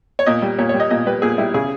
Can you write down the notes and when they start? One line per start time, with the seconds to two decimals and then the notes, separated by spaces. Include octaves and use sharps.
0.19 C#5
0.26 A#2 D#5
0.42 G3
0.58 A#2 C#5
0.69 G3 C#5
0.80 D#5
0.90 A#2 D#5
1.06 G3 B4
1.22 A#2 G#4
1.38 G3 E4
1.54 C#3 G#4